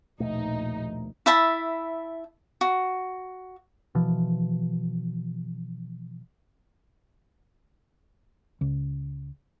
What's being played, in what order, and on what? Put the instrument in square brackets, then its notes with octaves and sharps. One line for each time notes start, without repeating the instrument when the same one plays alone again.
[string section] A#1 D#4 [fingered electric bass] D#2 B2 A3
[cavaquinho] E4 E5 A5 B5
F#4
[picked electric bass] B2 E3 F3
[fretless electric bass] C#2